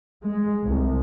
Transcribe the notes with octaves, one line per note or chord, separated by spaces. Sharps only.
G#3
C2